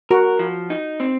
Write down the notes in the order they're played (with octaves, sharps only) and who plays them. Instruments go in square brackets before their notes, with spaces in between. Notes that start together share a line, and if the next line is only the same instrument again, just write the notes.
[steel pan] F#4 [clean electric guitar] A#4
[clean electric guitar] F3
D#4
C4